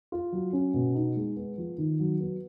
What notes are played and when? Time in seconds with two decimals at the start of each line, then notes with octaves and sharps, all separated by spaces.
0.12 F4
0.32 F#3
0.53 C#4
0.74 B2
0.95 D#4
1.16 G#3
1.36 B3
1.58 F3
1.78 D#3
2.00 F#3
2.20 B3